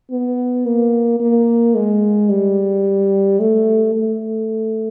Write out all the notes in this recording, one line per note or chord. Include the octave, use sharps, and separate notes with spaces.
B3
A#3
A#3
G#3
G3
A3
A3